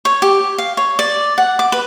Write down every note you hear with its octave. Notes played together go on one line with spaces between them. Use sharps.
C#5
G4
F5
C#5
D5
F#5
D6
B4